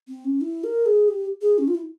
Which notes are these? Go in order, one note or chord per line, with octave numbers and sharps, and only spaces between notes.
C4
C#4
E4
A#4
G#4
G4
G#4
C#4
F4
E4